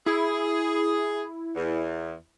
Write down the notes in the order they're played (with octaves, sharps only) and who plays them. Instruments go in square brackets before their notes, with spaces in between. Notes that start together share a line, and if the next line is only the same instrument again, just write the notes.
[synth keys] E4 [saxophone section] G#4
[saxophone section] E2